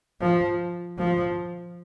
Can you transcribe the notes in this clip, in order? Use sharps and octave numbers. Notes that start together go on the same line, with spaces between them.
F3
F3